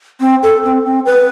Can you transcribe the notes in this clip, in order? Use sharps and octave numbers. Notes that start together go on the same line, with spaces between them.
C4
A4
C4
C4
B4